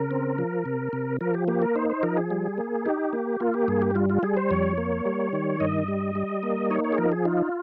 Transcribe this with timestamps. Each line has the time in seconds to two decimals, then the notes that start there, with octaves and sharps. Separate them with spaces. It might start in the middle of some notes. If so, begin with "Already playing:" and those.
Already playing: C#3 A#4
0.11 C4
0.38 F3
0.65 C3
0.93 C3
1.21 F3 A#4
1.34 G4
1.48 A#3 G4
1.62 A#4
1.75 D#4 C5
1.90 C5
2.03 F3 A#4
2.17 G#4
2.31 G3
2.58 A#3
2.85 D#4 G4
3.13 A#3
3.40 A#3 F4
3.54 G4
3.68 G2 G#4
3.82 G4
3.95 G3 F4
4.10 F4
4.23 G3 G#4
4.37 C5
4.50 F2 C#5
4.78 A#3
5.05 G3
5.33 D#3
5.60 G2 D#5
5.88 G3
6.15 G3
6.43 A#3
6.70 D#4 C#5
6.84 C#5
6.92 G#4
6.98 F3 A#4
7.12 G#4
7.25 D#4 F4